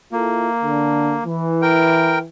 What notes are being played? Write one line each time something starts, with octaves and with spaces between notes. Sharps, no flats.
A#3 E4 F4 A4
D3 D4
E3
A#4 G5